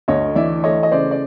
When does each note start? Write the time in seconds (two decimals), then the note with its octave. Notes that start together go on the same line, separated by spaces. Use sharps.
0.08 D2 C#5 D#5
0.35 E3 D5 E5
0.64 A3 C#5 D#5
0.83 D#5
0.92 C#3 C5 D5
1.11 D5